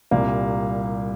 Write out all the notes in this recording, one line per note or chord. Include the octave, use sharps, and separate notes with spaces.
C2 A#2 G3 A#3